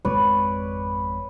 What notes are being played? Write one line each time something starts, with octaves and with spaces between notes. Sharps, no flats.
G#1 F2 B4 C#5 D5